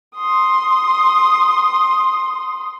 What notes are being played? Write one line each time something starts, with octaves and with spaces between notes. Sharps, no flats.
C6 D#6